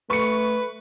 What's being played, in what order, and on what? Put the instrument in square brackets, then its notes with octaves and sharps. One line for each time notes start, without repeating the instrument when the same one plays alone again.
[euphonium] A3 [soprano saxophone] B4 [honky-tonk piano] C#6 C#7